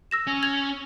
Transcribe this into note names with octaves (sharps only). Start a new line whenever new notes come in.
E6 A#6 E7
C#4
G#6 F7